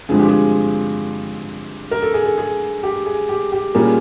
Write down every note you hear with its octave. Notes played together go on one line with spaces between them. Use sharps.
G2 D3 F3 G#3 C4 G#4
G4
G#4
A#4
A4
G#4
A4
G#4
G4
G#4
G4
G4
A#2 G3 A#3 C#4 G#4